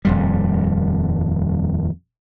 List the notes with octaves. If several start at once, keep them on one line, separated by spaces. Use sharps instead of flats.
D#1 F2 G3